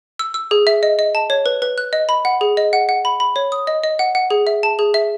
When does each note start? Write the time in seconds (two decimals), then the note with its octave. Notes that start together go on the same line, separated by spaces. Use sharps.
0.19 E6
0.34 E6
0.51 G#4
0.67 E5
0.83 D#5
0.99 D#5
1.15 A5
1.30 C#5
1.46 B4
1.62 B4
1.78 F#6
1.93 D#5
2.09 B5
2.25 F#5
2.41 G#4
2.57 D#5
2.73 F#5
2.89 F#5
3.05 B5
3.20 B5
3.36 C#5
3.52 D#6
3.67 D#5
3.83 D#5
3.99 F#5
4.15 F#5
4.30 G#4
4.47 E5
4.63 A5
4.79 G#4
4.94 E5